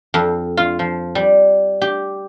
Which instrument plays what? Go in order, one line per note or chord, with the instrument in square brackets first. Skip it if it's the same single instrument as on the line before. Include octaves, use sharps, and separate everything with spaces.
[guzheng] F2
F4
F3
G3
G4